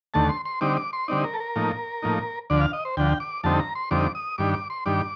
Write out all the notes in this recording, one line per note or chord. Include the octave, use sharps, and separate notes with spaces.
D#2 D3 A3 A5
C6
C6
D3 G3 C4 D#4 D6
D6
C6
D3 G3 C4 D#4 D5
A#4
A4
A#4
A2 F3 A#3 D#4
A2 F3 A#3 D#4
D2 D3 F3 D5
F5
D#5
C5
D2 D3 F3 G5
D6
F2 D3 G3 C4 D#4 A5
A#5
C6
F2 D3 G3 C4 D#4 D6
D#6
G2 D#3 G3 D4 D6
D6
C6
G2 D#3 G3 D4 D6